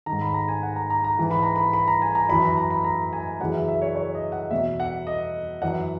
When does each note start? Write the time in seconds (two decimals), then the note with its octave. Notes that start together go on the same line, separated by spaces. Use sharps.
0.06 D#3 A#5
0.12 G#2
0.21 B5
0.34 A#5
0.48 G#5
0.63 F#5
0.76 A#5
0.90 A#5
1.04 A#5
1.19 G#2 E3
1.31 B5
1.43 A#5
1.56 B5
1.73 B5
1.88 A#5
2.02 G#5
2.15 A#5
2.29 F#2 E3 B5
2.43 A#5
2.57 A#5
2.71 B5
2.84 A#5
3.13 G#5
3.40 F#2 C#3 E3 F#5
3.54 E5
3.68 E5
3.82 C#5
3.95 C#5
4.15 D#5
4.32 F#5
4.51 E2 B2 E5
4.80 F#5
5.07 D#5
5.62 F#2 E3 F#5